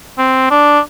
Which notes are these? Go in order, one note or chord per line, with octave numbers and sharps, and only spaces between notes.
C4
D4